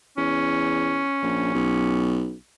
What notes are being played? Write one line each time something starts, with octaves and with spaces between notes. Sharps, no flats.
E2 C#4
A#1
B1